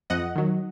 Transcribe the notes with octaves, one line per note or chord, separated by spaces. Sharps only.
F2 D#5 F#5
D#3 F#3